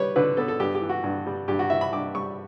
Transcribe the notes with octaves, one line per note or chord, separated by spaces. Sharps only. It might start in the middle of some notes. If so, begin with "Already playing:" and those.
Already playing: G3 B4 C#5
D3 B4
B3 A4
A4
G2 G4
G4
E3
F#4
G2
G3
G2 G4
F#4
E3 E5
B5
G2 D6
G3 C#6